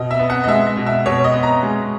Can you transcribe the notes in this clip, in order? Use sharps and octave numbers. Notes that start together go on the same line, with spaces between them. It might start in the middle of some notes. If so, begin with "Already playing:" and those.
Already playing: B2 D#5
E5
B3
F#5
D#5
G#3 E5
D#5
B2
E5
B2 C#5
D#5
B3
A#5
G#3